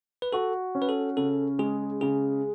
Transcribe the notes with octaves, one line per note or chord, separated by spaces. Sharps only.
B4
F#4 A4
C#4
B4
A4
C#3 A4
G#3 G#4
C#3 G#4